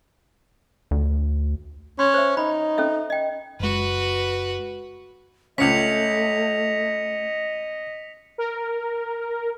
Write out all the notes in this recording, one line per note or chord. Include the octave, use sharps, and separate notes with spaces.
D2
C#4 C6
C5 E5
D#4 B5
C#4 A4 E5
D#5 G5
F#1 G#3 F#4 B4
C#2 A3 C#4 D#5 B6 C#7 F7
A#4